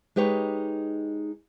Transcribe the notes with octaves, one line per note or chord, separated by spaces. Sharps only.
G#3 D#4 G4 B4 C#5